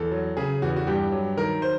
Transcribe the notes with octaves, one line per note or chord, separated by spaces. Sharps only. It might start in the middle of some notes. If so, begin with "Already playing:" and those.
Already playing: E2 A4
F#3
C#3 G#4
E2 F#4
F#4
G2 G4
F#3
D#3 A#4
C5